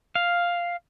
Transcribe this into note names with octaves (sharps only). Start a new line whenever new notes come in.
F5